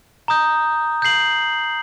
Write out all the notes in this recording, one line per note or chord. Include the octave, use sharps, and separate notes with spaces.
A#5 D#6 G6
G6 C7 F#7